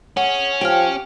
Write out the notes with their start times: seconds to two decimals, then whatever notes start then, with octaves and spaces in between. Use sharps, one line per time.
0.17 C#4 G#4 F#5
0.61 F3 G4 G5 F6